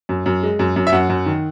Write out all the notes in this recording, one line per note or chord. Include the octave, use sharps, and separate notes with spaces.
F#2
F#2
G#3
F#2
F#2
E5
F#2 F#5
F#2
D#3